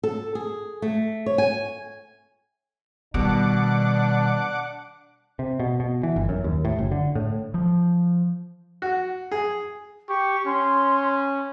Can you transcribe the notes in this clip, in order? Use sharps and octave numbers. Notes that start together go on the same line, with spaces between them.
A4
G#4
A3
C#5
G#5
B2 D#3 G3 D4 F#5 D6
C3
B2
B2
E3
G1
F#2
D#2
A2
F#1
D3
A2
F3
F#4
G#4
G4 C#6
C#4 C6